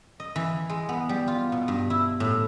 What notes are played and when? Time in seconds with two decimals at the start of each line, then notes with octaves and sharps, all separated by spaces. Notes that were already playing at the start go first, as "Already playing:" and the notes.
0.20 D#5
0.36 E3
0.69 G#3
0.89 B3
1.09 G3
1.28 F4
1.52 B2
1.68 G2
1.90 E4
2.20 A2